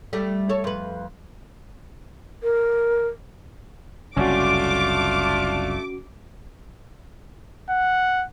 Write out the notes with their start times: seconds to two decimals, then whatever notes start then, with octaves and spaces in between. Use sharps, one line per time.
0.13 G3 A3
0.49 A4 C#5
0.64 F2 B4
2.43 A#4
4.17 F#1 C2 A3 C#4 D4 F4 F#4 D6
7.70 F#5